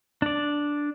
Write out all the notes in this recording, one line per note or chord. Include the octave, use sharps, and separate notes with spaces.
D4 D5